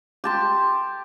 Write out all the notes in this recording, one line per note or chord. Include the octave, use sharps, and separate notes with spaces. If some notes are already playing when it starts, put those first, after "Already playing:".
G4 A5 C6